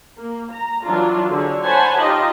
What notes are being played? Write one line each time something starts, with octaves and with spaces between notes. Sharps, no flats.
A#3
A#5
E3 F#3 D4 F4
D3 G#4 C#5
C5 C#5 F#5 G#5 A5 B5
D#4 F4 G4 D#5